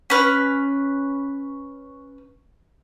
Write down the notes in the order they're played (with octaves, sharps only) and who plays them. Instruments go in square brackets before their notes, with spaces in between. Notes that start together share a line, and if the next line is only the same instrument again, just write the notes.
[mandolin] C#4 B4